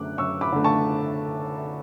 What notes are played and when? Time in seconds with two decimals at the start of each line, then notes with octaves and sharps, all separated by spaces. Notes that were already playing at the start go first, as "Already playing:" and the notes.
Already playing: F#2 D3 A3 D6 F#6
0.17 F#2 C#6 E6
0.41 B5 D6
0.52 D3 A3
0.64 A5 C#6